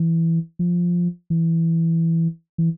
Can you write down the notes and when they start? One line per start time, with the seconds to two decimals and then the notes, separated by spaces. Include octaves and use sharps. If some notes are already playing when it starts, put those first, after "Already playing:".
Already playing: E3
0.59 F3
1.30 E3
2.58 E3